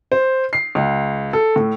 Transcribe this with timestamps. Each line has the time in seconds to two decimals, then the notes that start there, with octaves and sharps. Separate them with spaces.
0.12 C5
0.53 C7
0.75 C#2
1.33 A4
1.56 A2